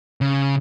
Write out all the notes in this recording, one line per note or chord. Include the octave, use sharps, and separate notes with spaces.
C#3